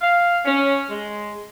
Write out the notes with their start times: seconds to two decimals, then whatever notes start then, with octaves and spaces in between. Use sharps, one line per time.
0.01 F5
0.45 C#4
0.90 G#3